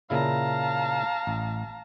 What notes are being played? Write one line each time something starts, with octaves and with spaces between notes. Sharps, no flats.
A#2 C#3 E4 F5 A5 A#5
A1